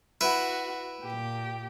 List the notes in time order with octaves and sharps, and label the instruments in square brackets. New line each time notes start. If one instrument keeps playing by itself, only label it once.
[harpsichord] E4 B4 [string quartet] F#4
[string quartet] A#2 G4